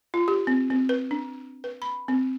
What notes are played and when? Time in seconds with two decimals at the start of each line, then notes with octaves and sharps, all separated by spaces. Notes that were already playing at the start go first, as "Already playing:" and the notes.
0.14 F4
0.28 G4
0.47 C4
0.70 C4
0.89 B4
1.11 D4
1.64 B4
1.82 B5
2.08 C4